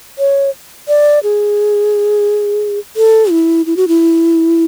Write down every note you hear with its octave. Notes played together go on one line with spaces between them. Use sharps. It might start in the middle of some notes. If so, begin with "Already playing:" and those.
C#5
D5
G#4
A4
E4
E4
F#4
E4